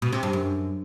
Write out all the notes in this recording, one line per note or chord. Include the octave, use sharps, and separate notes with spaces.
B2
C3
G2
F#2